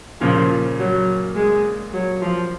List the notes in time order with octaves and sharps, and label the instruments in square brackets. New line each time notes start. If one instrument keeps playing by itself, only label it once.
[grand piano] A#2 C#3 [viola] F3
[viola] F#3
G#3
F#3
F3